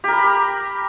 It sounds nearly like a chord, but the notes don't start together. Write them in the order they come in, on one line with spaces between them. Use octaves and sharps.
G4 A#4 B5